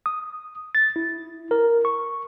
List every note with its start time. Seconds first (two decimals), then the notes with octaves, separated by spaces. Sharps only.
0.06 D#6
0.75 A6
0.96 E4
1.51 A#4
1.85 C#6